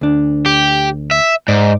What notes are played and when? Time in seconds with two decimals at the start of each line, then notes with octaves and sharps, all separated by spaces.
0.01 D2 D4
0.46 G4
1.11 E5
1.48 G#2 D5